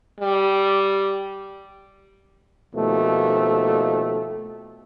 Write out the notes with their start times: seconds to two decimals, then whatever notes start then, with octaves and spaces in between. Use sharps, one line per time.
0.20 G3
2.74 D#2 B2 F3 A3